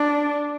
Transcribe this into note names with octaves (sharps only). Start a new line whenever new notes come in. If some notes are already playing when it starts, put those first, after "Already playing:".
Already playing: D4